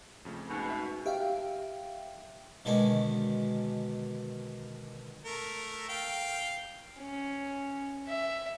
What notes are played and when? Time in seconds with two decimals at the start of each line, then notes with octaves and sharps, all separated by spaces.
0.25 F2 C#3 A3
0.49 G#2 B2
0.70 B4 E5
1.06 G4 E5 F5 G5
2.65 B2 D3 D#3 G#3 C#4 D4
5.25 A3 A#4
5.89 F5 G5
7.00 C#4
8.08 E5